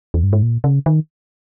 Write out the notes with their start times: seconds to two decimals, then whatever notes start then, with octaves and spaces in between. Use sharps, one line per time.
0.14 E2
0.23 G2
0.33 G#2
0.43 A#2
0.64 C#3
0.86 D#3